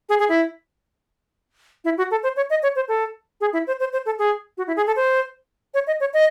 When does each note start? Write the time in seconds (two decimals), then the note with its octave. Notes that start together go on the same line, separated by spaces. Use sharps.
0.09 G#4
0.19 G#4
0.29 E4
1.85 E4
1.98 F#4
2.11 A4
2.23 C5
2.36 C#5
2.50 D#5
2.63 C#5
2.76 C5
2.88 A4
3.41 G#4
3.53 E4
3.67 C5
3.80 C5
3.93 C5
4.06 A4
4.19 G#4
4.57 F#4
4.67 E4
4.77 G#4
4.87 A4
4.96 C5
5.74 C#5
5.87 D#5
6.00 C#5
6.14 D#5